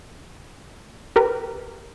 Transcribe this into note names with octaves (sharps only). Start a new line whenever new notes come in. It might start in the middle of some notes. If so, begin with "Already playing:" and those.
G4 A#4 B4